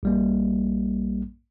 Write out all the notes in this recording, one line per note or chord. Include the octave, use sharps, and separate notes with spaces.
A#1 G3 A#3